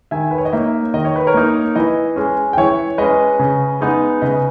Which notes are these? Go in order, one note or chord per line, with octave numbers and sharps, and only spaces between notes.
D#3 E5 G#5
B4
C#5
D#5
A#3 D#4 C#5 E5
D#3 D#5
C#5
B4
A#4 C#5
A#3 D#4
E3 B4 D#5
G#3 C#4
G5
E3 C#5 E5
G#3 C#4 B4 D#5
C#3
G#3 B3 D#4
C#3 B4 D#5